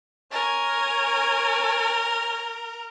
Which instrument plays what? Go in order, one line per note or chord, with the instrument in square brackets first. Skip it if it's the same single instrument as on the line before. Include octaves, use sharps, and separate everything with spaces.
[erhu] A#4 [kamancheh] C#5 G#5